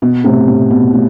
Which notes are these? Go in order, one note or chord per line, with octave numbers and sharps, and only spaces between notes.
B2
A2 C3
A2
B2
A2